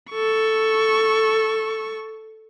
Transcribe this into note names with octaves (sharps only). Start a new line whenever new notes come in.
A4 C#6